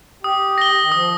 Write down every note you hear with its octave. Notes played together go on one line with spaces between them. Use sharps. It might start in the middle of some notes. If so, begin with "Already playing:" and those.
G4 D#6
A#6 G7
D#3
F3 D#6